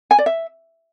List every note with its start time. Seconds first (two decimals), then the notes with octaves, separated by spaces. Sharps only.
0.11 G#5
0.18 D5
0.26 E5